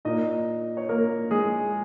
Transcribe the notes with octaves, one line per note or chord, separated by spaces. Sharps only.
A#2 A#3 D#4 D#5
C#5
A#3 A#4
G#3 G#4